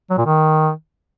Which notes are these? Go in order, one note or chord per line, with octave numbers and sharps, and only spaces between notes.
F#3
A#2
D#3